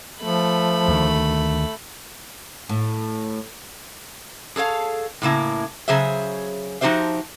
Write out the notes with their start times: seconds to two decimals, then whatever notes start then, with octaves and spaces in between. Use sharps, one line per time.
0.22 F3 A3 B5
0.88 D2 D#3
2.69 A2
4.56 G#4 A4 C#5 F5
5.22 A2 C#3 A#3 E4
5.88 C#3 F#3 G#4 C5 E5
6.81 F3 D#4 F#4 G4 C5 E5